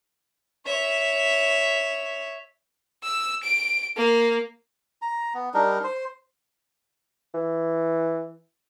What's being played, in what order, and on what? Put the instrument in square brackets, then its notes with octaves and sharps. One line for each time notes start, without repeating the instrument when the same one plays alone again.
[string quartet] C#5 E5
[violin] E6
D7
A#3
[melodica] A#5
B3
G3 D4 D#4 A#4
C5
[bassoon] E3